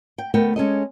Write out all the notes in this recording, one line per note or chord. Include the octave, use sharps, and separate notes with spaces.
G5
D2 A3 B3 A#4 G5
G#3 C#4 A4 D#5